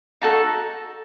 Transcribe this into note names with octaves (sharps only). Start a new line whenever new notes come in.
D#4 F#4 A4 A5